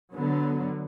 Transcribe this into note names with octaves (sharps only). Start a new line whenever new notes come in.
D3 F#3 B3